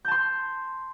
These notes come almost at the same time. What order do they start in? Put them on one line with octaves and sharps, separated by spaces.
G6 A5 C6